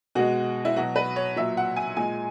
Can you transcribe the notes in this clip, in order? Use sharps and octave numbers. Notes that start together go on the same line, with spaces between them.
B2 G#3 F#4
E4
B2 F#3 F#4
B4
C#5
A#2 F#3 E5
F#5
G#5
A#2 G#3 G#5